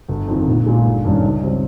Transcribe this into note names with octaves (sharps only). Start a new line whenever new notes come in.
G1
F2 D#3
A#1
A#2 G#3 D#4
G1
G2 D#3 G3 C#4
C#2
C#3 G3 C4